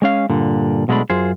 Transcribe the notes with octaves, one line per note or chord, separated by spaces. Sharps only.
G#3 C#4 F5
G2 A#2 D3
B1 B2 G#3 A3 D4 B5
F#2 F4 G#4 C5